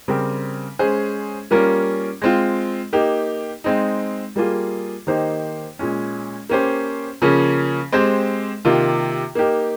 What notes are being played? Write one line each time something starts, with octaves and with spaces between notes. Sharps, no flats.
C#3 G3 C4 G4 A#4
G#3 C#4 G#4 C5
G3 A#3 C#4 F4 A#4
G#3 C4 F4
A#3 D#4 G4
G#3 C4 D#4
G3 A#3 F4 G#4
D#3 A#3 D#4 G4 C5
A#2 G#3 C#4
A#3 C#4 G4 C5
C#3 F3 A#3 C#4
G#3 C4 G4 C5
C3 D#3 A#3 F4
A#3 D#4 G4 A#4